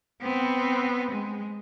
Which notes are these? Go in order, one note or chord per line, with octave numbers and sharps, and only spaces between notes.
B3 C4
G#3